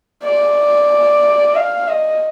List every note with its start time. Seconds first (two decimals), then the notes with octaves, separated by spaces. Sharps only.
0.24 D5
1.55 F5
1.88 D#5